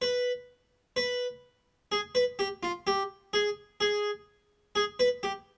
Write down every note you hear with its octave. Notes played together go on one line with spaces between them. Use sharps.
B4
B4
G#4
B4
G4
F4
G4
G#4
G#4
G#4
B4
G4